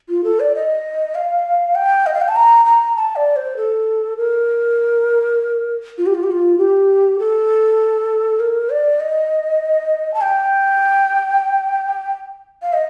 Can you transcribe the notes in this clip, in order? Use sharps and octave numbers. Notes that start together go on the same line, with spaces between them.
F4
A4
D5
D#5
F5
G5
D#5
F5
G5
A5
A#5
A#5
A5
D5
C5
A4
A#4
F4
G4
F4
G4
F4
G4
A4
A#4
D5
D#5
A5
G5
F5
D#5